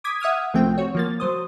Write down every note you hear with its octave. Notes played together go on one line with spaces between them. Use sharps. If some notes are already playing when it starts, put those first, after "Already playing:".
D6 D#6 G#6 B6
E5 F#5 D#6 F6 G#6
C2 F3 A3 C4 G5
F#4 C#5
F3 A#3 A6
F#3 C5 D#6